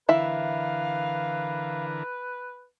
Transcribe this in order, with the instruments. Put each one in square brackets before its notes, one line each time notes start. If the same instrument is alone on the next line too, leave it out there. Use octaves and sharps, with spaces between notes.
[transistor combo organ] D3 E3 A#4 [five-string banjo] E4 E5 [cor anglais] B4 [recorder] F5